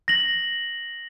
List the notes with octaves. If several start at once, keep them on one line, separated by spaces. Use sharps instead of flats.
A#6 F#7